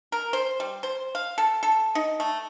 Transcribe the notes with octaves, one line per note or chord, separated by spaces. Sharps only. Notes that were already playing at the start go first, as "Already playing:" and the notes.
A#4
C5
G3
C5
F5
A4
A4
D#4
A3